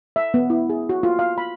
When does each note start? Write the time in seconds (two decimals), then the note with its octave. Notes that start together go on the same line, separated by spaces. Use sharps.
0.16 E5
0.34 B3
0.50 E4
0.69 G#4
0.89 F#4
1.03 F4
1.19 F5
1.38 B5